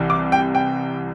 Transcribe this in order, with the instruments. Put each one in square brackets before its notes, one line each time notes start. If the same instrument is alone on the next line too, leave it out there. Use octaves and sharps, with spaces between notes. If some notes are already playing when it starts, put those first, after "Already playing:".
Already playing: [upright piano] C2 C3 E3
D6
G5
G5